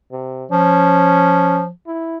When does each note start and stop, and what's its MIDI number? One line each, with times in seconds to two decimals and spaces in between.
0.12 0.45 48
0.51 1.69 53
0.51 1.61 61
1.87 2.17 64